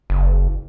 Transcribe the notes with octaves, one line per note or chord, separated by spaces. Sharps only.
F#1